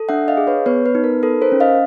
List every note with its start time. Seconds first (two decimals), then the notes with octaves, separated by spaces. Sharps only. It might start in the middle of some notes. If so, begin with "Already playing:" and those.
Already playing: A4
0.09 D4 E5 F#5
0.28 D#5 F5
0.37 G#4
0.47 B4 C#5
0.66 B3 B4 C#5
0.86 B4
0.95 D#4
1.04 A#4
1.23 A4 B4
1.42 A#4 C5
1.52 C#4
1.60 D#5 F5